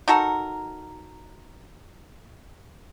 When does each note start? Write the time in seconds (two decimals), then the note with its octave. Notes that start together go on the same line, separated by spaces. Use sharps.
0.08 D#4 F#4 A4 A#4